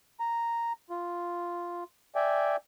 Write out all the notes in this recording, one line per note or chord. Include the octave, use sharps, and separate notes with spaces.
A#5
F4
D5 E5 G5 G#5